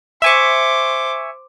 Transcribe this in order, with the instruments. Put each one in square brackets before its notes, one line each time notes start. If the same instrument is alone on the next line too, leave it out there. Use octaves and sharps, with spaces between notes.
[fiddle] C5 D6 [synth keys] E5 G#5 C#6